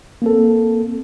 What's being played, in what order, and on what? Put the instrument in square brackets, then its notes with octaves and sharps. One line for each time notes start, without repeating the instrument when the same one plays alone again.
[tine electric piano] A#3 C4 A4